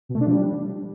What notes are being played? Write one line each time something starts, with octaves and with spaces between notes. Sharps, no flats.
B2
A3
D4
F3
G3